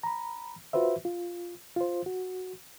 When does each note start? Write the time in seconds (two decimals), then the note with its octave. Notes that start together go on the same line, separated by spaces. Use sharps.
0.03 A#5 B5
0.73 F4 F#4 B4 C5 E5
1.05 F4
1.76 F4 C5
2.06 F#4